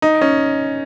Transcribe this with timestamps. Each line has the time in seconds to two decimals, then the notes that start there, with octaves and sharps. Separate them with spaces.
0.02 D#4
0.21 C#4